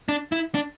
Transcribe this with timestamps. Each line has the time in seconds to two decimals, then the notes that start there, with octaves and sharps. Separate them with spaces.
0.09 D4
0.32 E4
0.55 D4